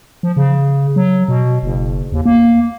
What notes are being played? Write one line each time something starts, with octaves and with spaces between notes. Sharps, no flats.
F3
C#3
F#3
B2
F#1
D#2
A#3